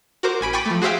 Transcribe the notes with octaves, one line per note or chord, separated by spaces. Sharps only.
F#4 A#4 C5 D6
A1 G#5 B5 D7
G5 G#5 B5 C#6 D6 A6
F3 A3
F#4 G#4 C5 E5 F5 G5